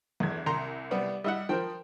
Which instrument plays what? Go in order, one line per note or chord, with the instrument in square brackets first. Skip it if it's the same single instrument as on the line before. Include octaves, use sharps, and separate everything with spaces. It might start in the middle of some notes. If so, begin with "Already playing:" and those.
[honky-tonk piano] G1 G#6 [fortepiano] E2
[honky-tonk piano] C2 [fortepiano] A#5 C6
[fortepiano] G3 B3
[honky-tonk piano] G3 E4 [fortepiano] D#5 E5 F#5
[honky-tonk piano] F3 [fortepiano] A#4 C5 G5